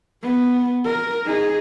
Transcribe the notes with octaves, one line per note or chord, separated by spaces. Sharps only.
B3
A#4
D#4 G#4